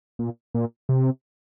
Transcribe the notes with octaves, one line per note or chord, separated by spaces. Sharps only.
A#2
A#2
C3